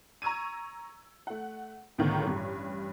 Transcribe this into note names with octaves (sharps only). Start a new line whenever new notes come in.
A#5 C#6 E6 G#6 D#7
A3 F#5
C#2 A2 D3 D#3 B3
A1 G2